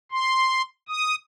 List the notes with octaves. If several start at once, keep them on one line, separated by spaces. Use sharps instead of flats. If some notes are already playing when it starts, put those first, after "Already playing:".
C6
D#6